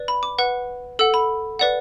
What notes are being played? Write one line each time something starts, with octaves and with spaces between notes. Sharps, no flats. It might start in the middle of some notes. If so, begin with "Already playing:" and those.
Already playing: B4 D5
B5
D6
B4 F#5
A4 F#5 E6
B5
B4 D5 F#5